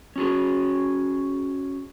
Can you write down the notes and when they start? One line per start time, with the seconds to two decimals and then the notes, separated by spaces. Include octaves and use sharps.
0.16 C#4 F#4 G#4